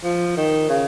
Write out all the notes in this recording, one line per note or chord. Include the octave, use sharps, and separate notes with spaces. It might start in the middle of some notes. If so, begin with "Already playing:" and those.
F3
D#3
C#3